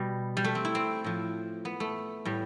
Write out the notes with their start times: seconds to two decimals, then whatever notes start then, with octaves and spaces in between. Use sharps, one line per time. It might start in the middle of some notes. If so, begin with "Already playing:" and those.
Already playing: B2 G3
0.37 G3
0.44 A3
0.55 C4
0.65 E4
0.75 C4
1.04 A2 F3
1.65 B3
1.80 A3
2.25 A2 G3